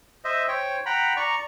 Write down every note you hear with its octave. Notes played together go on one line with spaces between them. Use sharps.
C5 D#5 E5
C5 C#5 G5
F#5 G5 A#5 B5
D5 A#5 C#6